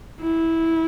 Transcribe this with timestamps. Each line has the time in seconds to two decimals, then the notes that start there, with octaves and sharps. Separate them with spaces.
0.21 E4